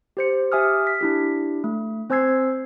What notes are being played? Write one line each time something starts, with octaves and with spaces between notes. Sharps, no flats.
G4 C5 C#7
G4 E5 G#5 D#6 F6
B6
D4 E4 G4
A3
C4 C5 G#5 E6 G#6 C7